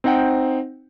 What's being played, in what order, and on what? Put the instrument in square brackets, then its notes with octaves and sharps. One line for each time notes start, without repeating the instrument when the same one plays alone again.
[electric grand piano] C4 D#4 C5 F#5 G5